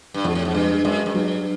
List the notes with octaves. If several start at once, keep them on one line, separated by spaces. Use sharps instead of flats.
G2
F2 G#2
A2
G#2
G2 G#3
F#2 G#3
F#2
G2 F#3